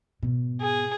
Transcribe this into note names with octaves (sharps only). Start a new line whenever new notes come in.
G#2 B2
G#4